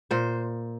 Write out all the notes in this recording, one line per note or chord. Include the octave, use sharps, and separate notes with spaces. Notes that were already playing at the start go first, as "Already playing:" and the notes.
A#2 C5